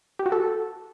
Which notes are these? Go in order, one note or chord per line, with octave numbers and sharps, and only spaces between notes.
G4
F#4
A4